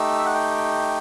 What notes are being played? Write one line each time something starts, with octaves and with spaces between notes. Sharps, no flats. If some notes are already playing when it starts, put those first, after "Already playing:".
Already playing: A3 D#4 G4 E6
E5
F#5
G5